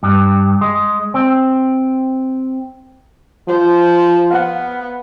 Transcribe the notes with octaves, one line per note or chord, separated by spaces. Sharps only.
G2
G#3
C4
F3 C5
B3 F5 F#5